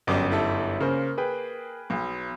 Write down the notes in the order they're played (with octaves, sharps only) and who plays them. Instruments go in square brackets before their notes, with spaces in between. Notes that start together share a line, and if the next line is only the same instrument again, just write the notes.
[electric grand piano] G1 F#2 D6 [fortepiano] D4 G4 D#5
[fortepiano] G3 E4 A4
[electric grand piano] C#3 C5 [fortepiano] A#3
[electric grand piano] G#4 B4 G5
[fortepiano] B1